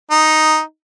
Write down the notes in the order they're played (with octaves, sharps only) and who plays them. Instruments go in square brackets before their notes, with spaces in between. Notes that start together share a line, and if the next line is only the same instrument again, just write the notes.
[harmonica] D#4